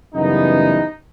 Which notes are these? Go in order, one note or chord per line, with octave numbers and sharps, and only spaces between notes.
F#2 C#3 E3 G3 B3 D#4